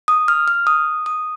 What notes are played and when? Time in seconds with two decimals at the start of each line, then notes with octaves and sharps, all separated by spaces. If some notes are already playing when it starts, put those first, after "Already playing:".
0.08 D#6
0.28 F6
0.48 F6
0.67 D#6
1.06 D#6